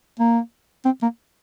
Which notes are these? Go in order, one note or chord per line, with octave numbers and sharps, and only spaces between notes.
A#3
C4
A#3